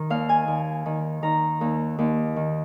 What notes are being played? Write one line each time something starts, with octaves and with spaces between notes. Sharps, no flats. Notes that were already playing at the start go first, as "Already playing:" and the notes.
Already playing: D#3
D#2 F5
G#5
D#2
D#3
D#3 A#5
D#2
D#2
D#3